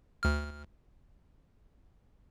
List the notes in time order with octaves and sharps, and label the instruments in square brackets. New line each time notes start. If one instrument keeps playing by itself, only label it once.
[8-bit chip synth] D2 F6